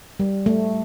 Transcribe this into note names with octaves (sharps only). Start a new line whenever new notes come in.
G3
A3